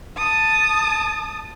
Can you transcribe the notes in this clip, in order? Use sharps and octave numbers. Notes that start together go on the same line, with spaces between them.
A5 D#6